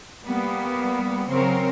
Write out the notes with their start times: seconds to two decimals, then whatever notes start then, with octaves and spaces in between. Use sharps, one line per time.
0.24 G3 A#3 B3
1.29 C#3 F#3 C4 A#4 C5 C#5